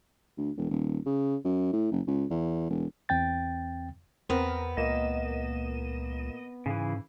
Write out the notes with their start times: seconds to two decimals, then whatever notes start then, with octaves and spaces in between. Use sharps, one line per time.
0.37 D2
0.57 E1
0.71 D#1
1.06 C#3
1.45 F#2
1.73 A2
1.92 F#1
2.07 C#2
2.30 E2
2.70 E1
3.09 E2 C4 G5 A6
4.30 E2 B3 C4 A#4
4.77 C#2 A#2 A#3 D#5 E7
6.66 G#2 C#3 E3